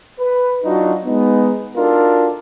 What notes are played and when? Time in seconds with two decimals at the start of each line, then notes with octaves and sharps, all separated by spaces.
0.19 B4
0.64 F#3 D4 D#4 F4 F#4
1.05 G#3 B3 D#4
1.76 D4 D#4 F4 F#4 A4 A#4